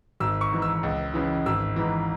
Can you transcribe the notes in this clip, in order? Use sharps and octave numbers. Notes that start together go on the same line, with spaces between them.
G#1 E6
C#6
G#2 E3
E6
C#2
C#3 E3
G#1 E6
G#2 E3